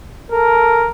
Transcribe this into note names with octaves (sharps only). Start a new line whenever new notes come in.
A4 A#4